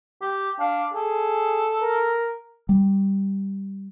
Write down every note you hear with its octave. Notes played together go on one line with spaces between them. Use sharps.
G4
D4 F5
G#4 A4
A#4
G3